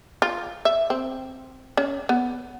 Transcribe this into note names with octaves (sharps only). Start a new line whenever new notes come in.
F4
E5
C4
C#4
B3